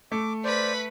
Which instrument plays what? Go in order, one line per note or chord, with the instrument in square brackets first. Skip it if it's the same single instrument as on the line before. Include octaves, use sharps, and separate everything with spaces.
[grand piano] A3 [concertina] D6
[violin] B4 B5 [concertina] C5 D5